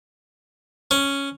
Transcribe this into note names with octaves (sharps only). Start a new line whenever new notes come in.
C#4